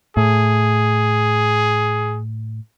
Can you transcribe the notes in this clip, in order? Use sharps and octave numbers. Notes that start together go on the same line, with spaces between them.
A2 G#4